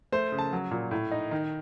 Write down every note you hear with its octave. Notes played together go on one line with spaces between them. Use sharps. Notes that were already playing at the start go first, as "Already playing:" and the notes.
A3 C5
C#3
A5
F#3
A#2
A2
D#4
D#3